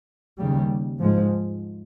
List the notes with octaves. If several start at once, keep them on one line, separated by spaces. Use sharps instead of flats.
D#2 C#3 G3
G#2 F3 G#3